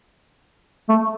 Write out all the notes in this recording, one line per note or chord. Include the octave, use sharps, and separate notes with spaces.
A3